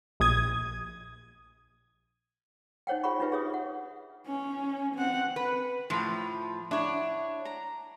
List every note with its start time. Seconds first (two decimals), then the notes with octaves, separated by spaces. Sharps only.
0.20 A#1 D#6 G#6
2.87 D#4 C5 C#5 F#5 G5
3.03 F4 G#4 C#5 F#5 B5 C#6
3.20 D4 D#4 F4 G4 B4 E5
3.32 G#4 C#5 E5 D#6
3.50 C#5 F#5
4.27 C#4
4.95 C4 F#5
5.36 B4
5.90 A2 F3 B5 C6
6.71 D4 E4 C#5 F#5
7.45 A#5